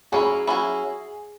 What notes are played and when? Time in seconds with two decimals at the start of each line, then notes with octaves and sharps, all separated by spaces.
0.12 F#3 C#4 E4 G#4
0.47 F#3 C#4 E4